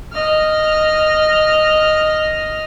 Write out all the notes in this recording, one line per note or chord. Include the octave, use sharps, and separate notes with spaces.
D#5 F6